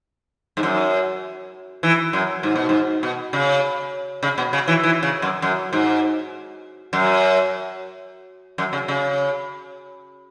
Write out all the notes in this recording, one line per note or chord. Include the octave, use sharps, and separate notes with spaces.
G#2
F#2
E3
F#2
G#2
B2
G#2
B2
C#3
C#3
B2
C#3
E3
E3
C#3
F#2
F#2
G#2
F#2
F#2
C#3
C#3